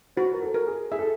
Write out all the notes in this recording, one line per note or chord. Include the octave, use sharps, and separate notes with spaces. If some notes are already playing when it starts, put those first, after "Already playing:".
F#4 C5
A#4
A4
A#4
G#4
G#4 E5
A4